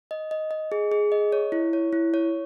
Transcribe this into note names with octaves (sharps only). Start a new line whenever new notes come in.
D#5
D#5
D#5
G#4
G#4
D#5
C#5
E4
C#5
E4
C#5